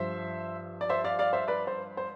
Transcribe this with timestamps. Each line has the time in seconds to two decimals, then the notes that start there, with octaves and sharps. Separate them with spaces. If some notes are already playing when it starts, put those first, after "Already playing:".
Already playing: G2 F3 C5 E5
0.81 D5
0.89 C5 E5
1.04 D5 F5
1.19 D5 F5
1.33 C5 E5
1.48 B4 D5
1.67 C5
1.97 C5